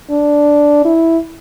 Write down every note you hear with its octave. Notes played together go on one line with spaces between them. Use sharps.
D4
E4